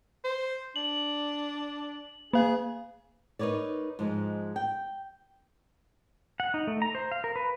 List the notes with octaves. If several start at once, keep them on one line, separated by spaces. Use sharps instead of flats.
C5
D4 F#7
A#3 G#4 F5
D#4 A#4 B4 C#5 D5
G#2 F3 G#3
G5
F#5
D#4
A3
A#5
C5
F5
A#4
B4